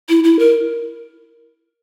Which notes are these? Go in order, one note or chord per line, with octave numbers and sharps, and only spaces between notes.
E4
E4
A#4